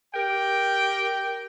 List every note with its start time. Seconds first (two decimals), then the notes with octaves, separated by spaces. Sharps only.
0.15 G4 A#4 G5